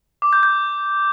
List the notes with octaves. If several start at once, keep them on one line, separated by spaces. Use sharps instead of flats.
D6
G6
G6